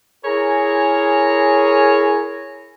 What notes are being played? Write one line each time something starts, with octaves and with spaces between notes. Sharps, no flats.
E4 G#4 A#4 C#5 G#5 A#5